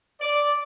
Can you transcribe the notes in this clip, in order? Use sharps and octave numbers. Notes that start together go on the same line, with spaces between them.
D5